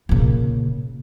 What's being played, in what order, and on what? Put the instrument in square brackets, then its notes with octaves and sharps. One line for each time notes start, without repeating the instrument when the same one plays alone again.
[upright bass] A#2 C#3